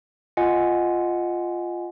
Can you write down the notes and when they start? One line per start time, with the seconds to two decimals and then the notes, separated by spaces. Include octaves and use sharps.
0.37 F4 D#5 F#5 G#5